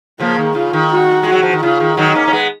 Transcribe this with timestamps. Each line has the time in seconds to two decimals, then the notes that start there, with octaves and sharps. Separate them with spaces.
0.20 C#3 F3 A#3
0.38 D#3
0.55 C#3 F4
0.73 D#3
0.92 F#4
1.23 G#3 F#4
1.32 F#3
1.43 F3
1.53 D#3
1.62 C#3 F4
1.80 D#3
1.97 D#3 F#3 D#4
2.15 A#3 C#4
2.27 C#4
2.33 G#3 B3